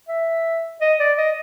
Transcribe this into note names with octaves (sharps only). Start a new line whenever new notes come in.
E5
D#5
D5
D#5